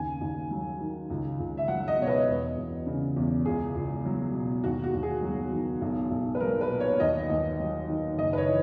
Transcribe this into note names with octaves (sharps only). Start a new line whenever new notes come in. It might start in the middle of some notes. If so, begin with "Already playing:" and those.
Already playing: D#2 C#3 G#5
D#2
F#3
D#3
C#2
C#2
E5
F#3 F#5
D#5
B2 C#5
B4
E1
E1
C#3
E2
C#2 G#4
C#2
F#3
B2
D#2 F#4
F#4
D#2
G#4
F#3
D#3
B1
B1
B4
F#3 A#4
B4
A#2
C#5
D#2 D#5
D#2
F#3
D#3
F#1 D#5
B4
C#5
E3